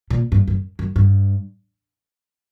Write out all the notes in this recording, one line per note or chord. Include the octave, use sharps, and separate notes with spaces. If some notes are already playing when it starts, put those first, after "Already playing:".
A#2
G2
F#2
F#2
G2